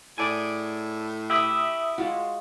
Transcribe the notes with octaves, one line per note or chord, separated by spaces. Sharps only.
A2 G#4 D5 G#5
E4 G4 E5 D#6 E6
G#3 F4 F#4